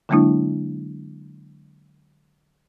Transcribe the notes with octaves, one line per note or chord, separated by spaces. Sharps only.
D3 F#3 G#3 A#3 D4 E4